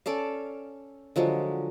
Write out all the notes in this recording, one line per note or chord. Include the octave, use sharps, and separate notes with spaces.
C#4 A4 D5 F5
D3 F3 F#3 G#3